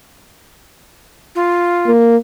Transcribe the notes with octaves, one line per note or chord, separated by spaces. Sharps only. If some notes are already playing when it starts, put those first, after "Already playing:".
F4
A#3